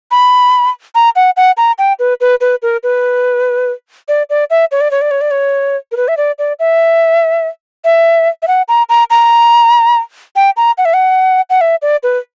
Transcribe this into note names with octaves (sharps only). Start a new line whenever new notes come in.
B5
A#5
F#5
F#5
A#5
G5
B4
B4
B4
A#4
B4
D5
D5
E5
C#5
D5
C#5
D5
C#5
D5
C#5
A#4
B4
E5
D5
D5
E5
E5
E5
F#5
A#5
A#5
A#5
G5
A#5
F#5
E5
F#5
F#5
E5
D5
B4